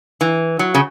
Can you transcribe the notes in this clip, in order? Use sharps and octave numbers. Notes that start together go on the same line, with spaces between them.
E3
F#3
C#3